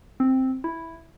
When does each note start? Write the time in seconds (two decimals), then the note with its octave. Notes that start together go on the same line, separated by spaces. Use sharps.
0.20 C4
0.64 E4